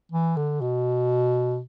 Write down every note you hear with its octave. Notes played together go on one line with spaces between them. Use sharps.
E3
D3
B2